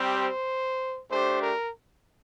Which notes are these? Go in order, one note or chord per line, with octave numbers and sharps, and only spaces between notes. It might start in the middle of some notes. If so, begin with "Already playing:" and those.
Already playing: G3 C4 G4
C5
A3 D4 G4 C5
A#4